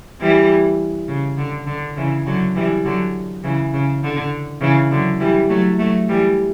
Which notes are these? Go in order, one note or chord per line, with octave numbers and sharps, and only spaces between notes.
E3 G3
C#3
D3
D3
C#3 E3
D3 F#3
E3 G3
D3 F#3
C#3 E3
C#3
D3
C#3 E3
D3 F#3
E3 G3
F#3 A3
F#3 A3
E3 G3